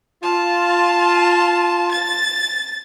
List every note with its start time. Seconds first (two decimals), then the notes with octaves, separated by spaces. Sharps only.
0.23 F4 A5
1.91 A6